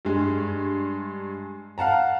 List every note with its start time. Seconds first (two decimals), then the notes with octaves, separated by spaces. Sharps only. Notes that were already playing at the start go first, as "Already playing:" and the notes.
0.05 G2 G#3
1.78 F5 F#5 A5 A#5